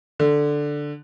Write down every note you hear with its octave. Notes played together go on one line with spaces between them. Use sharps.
D3